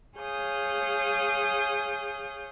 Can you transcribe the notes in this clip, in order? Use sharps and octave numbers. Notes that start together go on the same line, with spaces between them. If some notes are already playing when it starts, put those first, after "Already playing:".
G#4 C#5 F5 D#6 G6